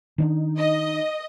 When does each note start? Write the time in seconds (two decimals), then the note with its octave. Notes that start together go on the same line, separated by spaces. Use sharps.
0.18 D#3 C4 D4 D#4
0.58 D#5